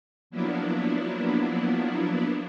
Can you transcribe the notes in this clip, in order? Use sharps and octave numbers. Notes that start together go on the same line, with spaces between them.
F3 F#3 A#3 B3 D4 E4